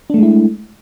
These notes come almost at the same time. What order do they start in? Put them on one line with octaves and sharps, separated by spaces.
D4 A3 G#3 E4